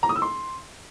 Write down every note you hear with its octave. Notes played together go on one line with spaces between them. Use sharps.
A#5
D#6
E6
C6